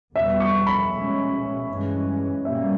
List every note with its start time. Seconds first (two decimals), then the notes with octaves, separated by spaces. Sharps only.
0.14 E2 B2 G3 B3 E5
0.40 C#6
0.67 B5
0.91 B2 G#3 C#4
1.68 G2 E3 G#3 C#4
2.45 B2 G3 A#3 C#4 E5